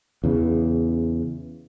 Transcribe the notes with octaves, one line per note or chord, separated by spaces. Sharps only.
E2 C#3